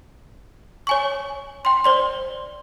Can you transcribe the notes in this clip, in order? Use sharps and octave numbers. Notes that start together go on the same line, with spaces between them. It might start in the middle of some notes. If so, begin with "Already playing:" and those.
C#5 G#5 C#6
G5 C6
C5 D5 C6